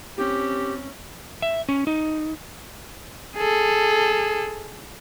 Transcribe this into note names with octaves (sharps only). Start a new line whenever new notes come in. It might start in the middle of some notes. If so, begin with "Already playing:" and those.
C4 C#4 G4
E5
C#4
D#4
G#4 A4